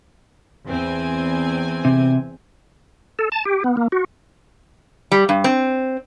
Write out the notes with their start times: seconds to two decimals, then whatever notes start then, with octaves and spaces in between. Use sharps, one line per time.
0.66 E2 C4 G#5
1.85 C3
3.19 A4
3.32 A5
3.45 G4
3.64 B3
3.77 A#3
3.92 F#4
5.12 G3
5.29 G2
5.44 C4